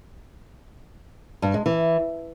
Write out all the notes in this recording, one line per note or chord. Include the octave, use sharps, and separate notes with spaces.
G2
G#3
E3